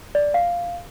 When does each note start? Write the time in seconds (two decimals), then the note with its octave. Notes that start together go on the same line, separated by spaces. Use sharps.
0.15 D5
0.34 F5